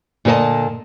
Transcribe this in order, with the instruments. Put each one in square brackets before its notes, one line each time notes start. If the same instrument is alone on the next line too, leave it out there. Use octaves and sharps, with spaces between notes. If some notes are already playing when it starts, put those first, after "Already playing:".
[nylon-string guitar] A#2 D3 G#4 B4 D#5 A5